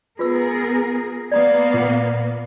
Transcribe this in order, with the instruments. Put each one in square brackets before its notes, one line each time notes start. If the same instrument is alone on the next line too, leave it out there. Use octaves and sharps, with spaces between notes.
[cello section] B3 G#4 A#4 [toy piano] F4 B4 E6
[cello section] A#3 B3 [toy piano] D5 A#5 D#6
[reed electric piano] A#2